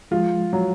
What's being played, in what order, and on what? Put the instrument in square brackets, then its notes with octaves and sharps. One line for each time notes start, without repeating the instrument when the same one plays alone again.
[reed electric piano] F3 G#3 [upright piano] F4
[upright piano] F#3